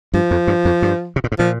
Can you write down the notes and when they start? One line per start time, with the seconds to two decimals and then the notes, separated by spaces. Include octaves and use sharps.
0.14 G2 F3
0.31 F2
0.47 G2
0.65 F2
0.82 G2
1.16 C3
1.24 A#2
1.32 G#2
1.38 A#2 F3